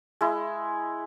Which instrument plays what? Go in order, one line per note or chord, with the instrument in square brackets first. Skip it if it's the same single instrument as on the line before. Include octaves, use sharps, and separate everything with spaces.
[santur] G#3 E4